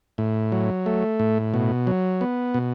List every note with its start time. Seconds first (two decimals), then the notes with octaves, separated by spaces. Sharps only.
0.18 A2
0.52 F#3
0.86 A3
1.20 A2
1.54 B2
1.87 F#3
2.21 B3
2.54 B2